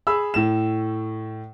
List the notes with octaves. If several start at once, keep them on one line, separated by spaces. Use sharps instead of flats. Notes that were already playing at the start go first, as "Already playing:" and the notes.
G#4 B5 E6
A2 E7